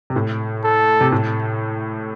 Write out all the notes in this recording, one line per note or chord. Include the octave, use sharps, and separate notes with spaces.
C3
A2
A4
C3
A2